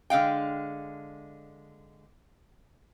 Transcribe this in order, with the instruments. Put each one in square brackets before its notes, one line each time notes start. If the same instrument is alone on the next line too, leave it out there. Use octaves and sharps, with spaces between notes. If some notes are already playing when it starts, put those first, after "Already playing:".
[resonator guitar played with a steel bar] D3 G#3 F5 G5